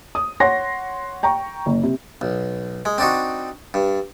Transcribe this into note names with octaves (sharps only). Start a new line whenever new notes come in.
D#6
C#5 F#5 C6 A#6
G5 A#5 C#6
F#1
C3
B1
G#3
C4 D4 D#4 F#4
G2